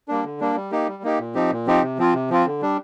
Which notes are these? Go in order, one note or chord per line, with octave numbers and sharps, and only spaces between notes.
G3 A#3 D4
D3
G3 A#3 D4
G3
A#3 D#4 G4
G3
A#3 D#4 G4
A#2
F3 C4 D#4 G4
A#2
F3 C4 D#4 G4
C3
F3 C4 F4
C3
F3 C4 F4
D3
G3 D4